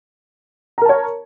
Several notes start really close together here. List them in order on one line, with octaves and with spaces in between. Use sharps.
A#5 A#4 A5 C#5